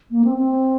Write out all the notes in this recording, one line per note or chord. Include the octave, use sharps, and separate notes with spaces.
A#3
C4
C4